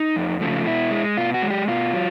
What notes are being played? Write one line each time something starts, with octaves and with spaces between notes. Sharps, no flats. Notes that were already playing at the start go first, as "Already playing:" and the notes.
Already playing: D#4
F2
C#3 F3 A3
B2 E4
G#3
B2 F4
F#4
G#3
G4
B2 F4
F#3